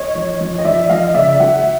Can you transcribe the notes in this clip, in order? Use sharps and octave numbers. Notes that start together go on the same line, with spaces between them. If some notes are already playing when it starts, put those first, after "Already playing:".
Already playing: C#5 D#5
F3
F3
D#5
F3 D5 E5
F3 D#5 F5
C#3 D5 E5
F#3 E5 F#5